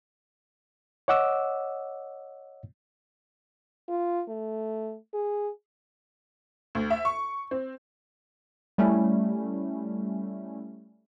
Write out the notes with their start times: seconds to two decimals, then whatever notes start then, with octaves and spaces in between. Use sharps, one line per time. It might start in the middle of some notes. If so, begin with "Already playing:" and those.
1.08 C#5 D#5 F#5 D6 E6
3.89 F4
4.28 A3
5.14 G#4
6.75 D2
6.90 E5
7.05 C#6
7.51 C4
8.78 G3 A3 C#4 E4